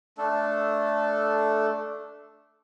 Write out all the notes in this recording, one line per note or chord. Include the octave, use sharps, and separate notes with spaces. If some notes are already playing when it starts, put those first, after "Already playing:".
A3 D4 A4